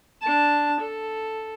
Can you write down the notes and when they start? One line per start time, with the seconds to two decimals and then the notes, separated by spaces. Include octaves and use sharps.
0.22 D4 A5
0.80 A4